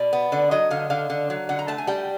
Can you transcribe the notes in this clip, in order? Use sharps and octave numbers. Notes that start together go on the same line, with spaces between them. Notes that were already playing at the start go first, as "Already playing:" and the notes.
Already playing: B2 D5
B3
D3 D5
F#3 D#5
D3 F5
D3 F5
D3
F#3
D3 F#5
A#5
A3 A5
G#5
G3 G5